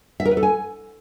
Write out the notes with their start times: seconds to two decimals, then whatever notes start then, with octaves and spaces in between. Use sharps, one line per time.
0.20 E5
0.25 A#4
0.31 B4
0.37 A4
0.43 G#5